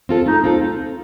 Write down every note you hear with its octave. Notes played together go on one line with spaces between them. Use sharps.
C4 F4 A4
A3 D#4
C4 F4 A4